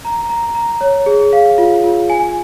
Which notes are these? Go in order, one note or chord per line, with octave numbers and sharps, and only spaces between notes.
A#5
A#5
A#5
C#5
G#4
F5
F4
F4
G#5